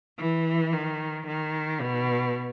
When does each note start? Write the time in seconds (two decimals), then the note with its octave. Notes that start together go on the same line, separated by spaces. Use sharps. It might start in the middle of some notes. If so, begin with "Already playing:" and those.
0.19 E3
0.73 D#3
1.27 D#3
1.81 B2